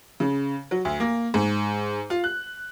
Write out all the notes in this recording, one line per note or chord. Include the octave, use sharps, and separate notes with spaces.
C#3
F#3
D2
A#3
G#2
F4
F#6